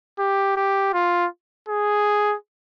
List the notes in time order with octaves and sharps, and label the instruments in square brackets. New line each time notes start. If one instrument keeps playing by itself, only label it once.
[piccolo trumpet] G4
G4
F4
G#4